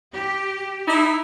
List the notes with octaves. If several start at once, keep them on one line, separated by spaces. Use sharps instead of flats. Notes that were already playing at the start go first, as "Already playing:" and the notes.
G4
D#4 E4